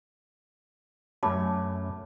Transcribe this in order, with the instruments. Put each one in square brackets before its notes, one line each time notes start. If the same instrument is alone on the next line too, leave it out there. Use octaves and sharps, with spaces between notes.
[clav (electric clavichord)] F#2 A3 C#4 [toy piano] A5 B5 D6